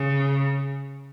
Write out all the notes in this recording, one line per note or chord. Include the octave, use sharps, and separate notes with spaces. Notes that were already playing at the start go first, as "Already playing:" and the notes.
Already playing: C#3